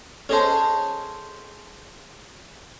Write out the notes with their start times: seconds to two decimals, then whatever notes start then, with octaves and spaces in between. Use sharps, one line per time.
0.29 C#4 G#4 A4 C5 D#5 A5